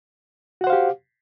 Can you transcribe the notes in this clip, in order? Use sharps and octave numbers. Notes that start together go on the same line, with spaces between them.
F#4 G4 C5 F5 F#5